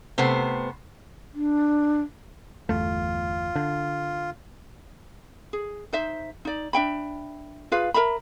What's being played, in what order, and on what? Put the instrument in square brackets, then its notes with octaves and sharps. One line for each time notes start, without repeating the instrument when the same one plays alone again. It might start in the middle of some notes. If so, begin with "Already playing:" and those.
[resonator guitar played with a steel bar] C3 A3 B3 C5
[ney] D4
[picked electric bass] G1 E2 A3 [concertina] F4
[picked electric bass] D3
[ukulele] G#4
D#4 C5 E5
D#4 D5
D4 E5 G5 B5
F4 G#4 B4 F5
A#4 E5 A#5 B5